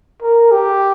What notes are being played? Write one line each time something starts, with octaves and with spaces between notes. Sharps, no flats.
A#4
G4